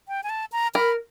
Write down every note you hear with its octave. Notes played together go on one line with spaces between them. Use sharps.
G5
G#5
A5
A#5
A#4 B5